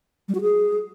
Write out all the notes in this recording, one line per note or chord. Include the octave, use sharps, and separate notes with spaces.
G3
F#4
G#4